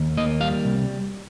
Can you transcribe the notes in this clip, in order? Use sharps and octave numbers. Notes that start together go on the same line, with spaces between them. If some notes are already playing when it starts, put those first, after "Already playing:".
Already playing: D#2
A#3 D#5
G3 F5
C2